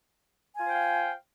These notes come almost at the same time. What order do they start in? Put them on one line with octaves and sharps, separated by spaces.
G#5 F4 C5 G5 F5